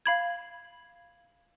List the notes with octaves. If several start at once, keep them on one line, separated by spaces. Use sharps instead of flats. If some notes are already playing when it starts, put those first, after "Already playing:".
F5 B5 G#6